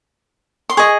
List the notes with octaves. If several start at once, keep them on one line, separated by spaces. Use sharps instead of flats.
C6
G#4 D#5 C#6